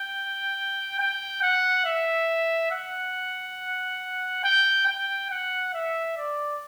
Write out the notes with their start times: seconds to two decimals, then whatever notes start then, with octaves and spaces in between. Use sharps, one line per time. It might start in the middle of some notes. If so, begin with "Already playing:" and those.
Already playing: G5
1.00 G5
1.43 F#5
1.85 E5
2.71 F#5
4.44 G5
4.87 G5
5.31 F#5
5.74 E5
6.17 D5